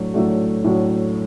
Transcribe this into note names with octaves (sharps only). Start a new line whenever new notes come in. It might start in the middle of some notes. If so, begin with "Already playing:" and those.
Already playing: A2 F#3 A3 D4 F#4
A2 F#3 A3 D4 F#4
A2 F#3 A3 D4 F#4